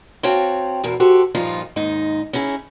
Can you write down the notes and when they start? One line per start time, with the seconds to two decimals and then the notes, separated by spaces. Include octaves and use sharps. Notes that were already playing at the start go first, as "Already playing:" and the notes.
0.23 C4 F#4 C#5 F5 G5 A5
0.83 E2 G#2 B2 A#4
1.00 F#4 G4 A4 C5
1.35 G2 A#2 F3 D#4 F4
1.76 D#2 G#2 D#4
2.33 C#4 D#4 E4 G#4